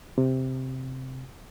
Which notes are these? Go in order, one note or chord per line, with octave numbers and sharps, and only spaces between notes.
C3